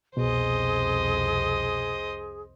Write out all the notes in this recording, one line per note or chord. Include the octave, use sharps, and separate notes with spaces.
C2 F2 B2 G#4 C5 D#5